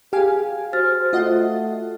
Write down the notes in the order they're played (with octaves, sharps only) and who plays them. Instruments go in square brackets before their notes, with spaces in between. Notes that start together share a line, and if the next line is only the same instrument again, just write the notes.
[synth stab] G4 F5 G#5 [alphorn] G#4
[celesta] F#4 F6 A6 [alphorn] C5
[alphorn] A3 [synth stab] F4 D#5 F#5